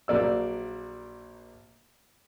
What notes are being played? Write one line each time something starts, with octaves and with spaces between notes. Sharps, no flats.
A#1 F#3 A#3 D5 E6